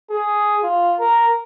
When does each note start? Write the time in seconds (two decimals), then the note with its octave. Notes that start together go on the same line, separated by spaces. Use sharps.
0.11 G#4
0.63 F4
1.00 A#4